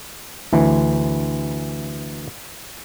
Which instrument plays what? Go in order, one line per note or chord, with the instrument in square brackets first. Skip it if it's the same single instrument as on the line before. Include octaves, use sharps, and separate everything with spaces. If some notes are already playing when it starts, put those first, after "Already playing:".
[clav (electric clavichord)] D2 E3